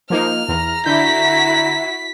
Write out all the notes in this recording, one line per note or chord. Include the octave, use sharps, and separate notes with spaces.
F3 A#3 D#4 F6
E2 A#5
D3 E4 F#4 G6 B6